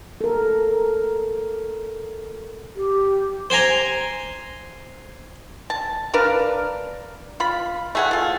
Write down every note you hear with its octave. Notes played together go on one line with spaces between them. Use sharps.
A4 A#4
G4
C5 G5 G#5 A#5
A5
D4 A#4 B4 F5
F4 B5
A3 G#4 F#5
A3 F4